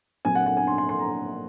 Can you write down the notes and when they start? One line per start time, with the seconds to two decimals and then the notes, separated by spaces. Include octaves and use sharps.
0.25 A#2 F#3 C4 G#5
0.35 F#5
0.46 F#5
0.57 G#5
0.67 C6
0.78 C6
0.89 C6
0.99 A#5